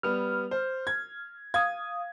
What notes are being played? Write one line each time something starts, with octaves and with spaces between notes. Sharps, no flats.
G3 B3 F6
C5
G#6
F5 D#6 G#6